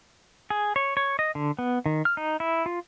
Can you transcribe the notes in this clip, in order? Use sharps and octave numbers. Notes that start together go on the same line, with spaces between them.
G#4
C#5
C#5
D#5
D3
B3
D#3
F6
D#4
E4
F4